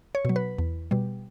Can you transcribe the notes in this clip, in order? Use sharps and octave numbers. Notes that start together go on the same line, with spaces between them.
C#5
B2 F#3
B4
E2
B2 G3